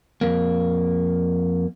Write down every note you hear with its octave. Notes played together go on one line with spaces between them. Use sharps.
F2 A#3